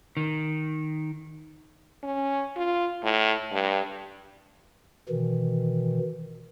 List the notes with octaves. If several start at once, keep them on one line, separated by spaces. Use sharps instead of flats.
D#3
C#4
F4
A2
G2
B2 D#3 E3